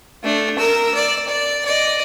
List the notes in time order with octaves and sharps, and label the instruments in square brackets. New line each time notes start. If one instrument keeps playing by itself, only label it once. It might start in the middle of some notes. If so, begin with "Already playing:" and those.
[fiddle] A3 D4
A#4 E6
D5
D5
D5 D#5